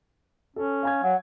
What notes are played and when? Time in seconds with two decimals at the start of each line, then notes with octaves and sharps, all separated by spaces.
0.56 C#4 A4
0.83 F5 G#5 G#6
1.03 F#3 F#5